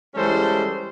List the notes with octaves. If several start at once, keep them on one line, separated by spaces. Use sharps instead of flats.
E3 G3 G#3 C#4 A4 C5